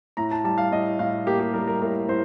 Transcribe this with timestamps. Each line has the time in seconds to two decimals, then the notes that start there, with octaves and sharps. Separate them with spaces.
0.17 A2 A#5
0.31 A5
0.44 G3 A5
0.58 F5
0.72 A2 D#5
0.99 A2 F5
1.27 A#3 G4
1.40 G4
1.54 G3 A#4
1.68 A#4
1.82 A2 A#4
2.09 A2 C5